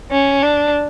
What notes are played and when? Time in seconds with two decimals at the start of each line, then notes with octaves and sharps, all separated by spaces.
0.12 C#4
0.43 D4